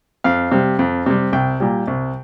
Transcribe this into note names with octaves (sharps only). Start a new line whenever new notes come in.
F2 F5
C3 G3
F2
C3 G3
C2 G5
A#2 G3
C2